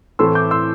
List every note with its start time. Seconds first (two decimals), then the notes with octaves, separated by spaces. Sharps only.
0.19 A2 E3 A3 C4 C6 E6
0.35 D6 G6
0.51 C6 E6